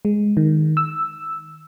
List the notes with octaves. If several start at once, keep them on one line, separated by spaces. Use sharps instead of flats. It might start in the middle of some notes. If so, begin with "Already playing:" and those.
G#3
D#3
E6